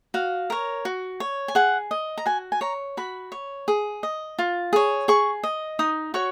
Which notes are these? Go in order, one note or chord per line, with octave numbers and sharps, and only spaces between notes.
F#4 F5
A#4 C#5
F#4
C#5
G#5
G#4 F#5
D#5
A#5
F#4 G#5
G#5
C#5 A#5
F#4 B5
C#5
G#4
D#5
F4
G#4 C#5
G#4 C#6
D#5
D#4 D#6
F#4 C#5 C#6